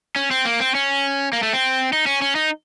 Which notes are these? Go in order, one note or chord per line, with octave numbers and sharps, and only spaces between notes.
C#4
C4
A#3
C4
C#4
A#3
A3
C4
D#4
C#4
C#4
D#4